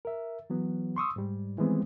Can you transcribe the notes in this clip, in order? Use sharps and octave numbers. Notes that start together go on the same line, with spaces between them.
A#4 E5
E3 F#3 B3
C6 C#6 D#6 E6
G#2 G3
D#3 E3 G3 G#3 B3 C4